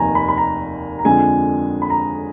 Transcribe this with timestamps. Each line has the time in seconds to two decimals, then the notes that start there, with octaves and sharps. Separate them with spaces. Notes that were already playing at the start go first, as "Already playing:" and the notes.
Already playing: F1 D#2 D#3 G#5 A#5
0.15 B5
0.28 B5
0.37 A#5
0.99 A#5
1.05 F2 D3 G#3 G#5
1.82 B5
1.90 A#5